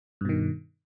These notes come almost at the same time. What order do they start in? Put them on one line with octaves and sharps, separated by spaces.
G2 B2 D#3